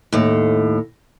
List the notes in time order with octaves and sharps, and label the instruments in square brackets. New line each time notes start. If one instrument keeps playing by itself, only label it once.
[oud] D#2 A2